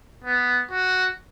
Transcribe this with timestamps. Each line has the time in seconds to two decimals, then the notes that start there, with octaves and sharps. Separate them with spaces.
0.24 B3
0.71 F#4